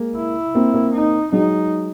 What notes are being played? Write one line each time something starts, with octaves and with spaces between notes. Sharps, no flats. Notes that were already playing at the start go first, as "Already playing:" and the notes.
Already playing: G#3 A#3
E4
A#3 C4
A#3 C4
D#4
F#3 G#3 D#4